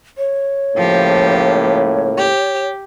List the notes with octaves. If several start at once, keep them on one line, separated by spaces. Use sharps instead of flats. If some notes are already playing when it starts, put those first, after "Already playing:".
C#5
C#2 A2 F3 A#3 G4
G4